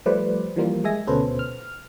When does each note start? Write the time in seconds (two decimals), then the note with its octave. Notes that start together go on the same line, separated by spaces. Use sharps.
0.06 F3 G3 A3 B4 C5 D5
0.56 E3 F3 G3 A#3 F4
0.84 G#3 G#4 E5 G#5 A#6
1.07 D2 B2 C#4 A4 B4 C5
1.39 F6